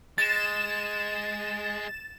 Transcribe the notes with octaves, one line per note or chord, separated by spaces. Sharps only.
G#3 A6 E7